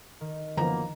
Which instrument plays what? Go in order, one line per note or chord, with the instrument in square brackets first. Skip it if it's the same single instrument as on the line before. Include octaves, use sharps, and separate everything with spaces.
[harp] D#3
[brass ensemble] F#2 A#3 B3 [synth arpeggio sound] D3 E3 F3 [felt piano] A#5